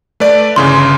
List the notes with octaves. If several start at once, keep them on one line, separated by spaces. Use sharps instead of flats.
A3 B4 D5
G1 C#3 E3 C6